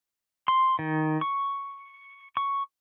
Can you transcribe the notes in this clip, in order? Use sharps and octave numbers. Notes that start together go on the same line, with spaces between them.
C6
D#3
C#6
C#6